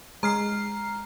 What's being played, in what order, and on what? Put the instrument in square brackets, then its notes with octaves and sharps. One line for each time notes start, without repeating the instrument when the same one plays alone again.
[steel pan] G#3 [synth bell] A#5 F6 C7